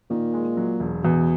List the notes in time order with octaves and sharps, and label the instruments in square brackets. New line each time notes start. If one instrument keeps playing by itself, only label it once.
[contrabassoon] A#2 [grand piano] D#3
[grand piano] G#3
F#3
E1
[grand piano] E2 [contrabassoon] B2